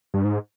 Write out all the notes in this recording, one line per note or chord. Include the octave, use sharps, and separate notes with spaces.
G2
G#2